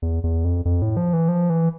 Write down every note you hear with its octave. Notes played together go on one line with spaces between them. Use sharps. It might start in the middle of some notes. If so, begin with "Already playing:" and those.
E2
E2
F2
F2
A2
F3
E3
F3
E3